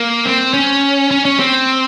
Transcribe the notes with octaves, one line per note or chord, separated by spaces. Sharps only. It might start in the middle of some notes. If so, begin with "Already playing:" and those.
Already playing: A#3
C4
C#4
C#4
C#4
C4